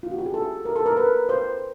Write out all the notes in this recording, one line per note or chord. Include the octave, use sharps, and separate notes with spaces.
F4
F#4
G4
G#4
A4
A#4
A4
A#4
B4
C5